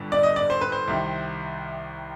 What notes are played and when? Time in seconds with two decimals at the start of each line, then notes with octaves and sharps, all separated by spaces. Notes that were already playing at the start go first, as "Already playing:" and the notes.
Already playing: G1 G2 D3
0.12 D5
0.23 D#5
0.36 D5
0.50 C5
0.61 B4
0.72 C5
0.87 C2 C3 D#3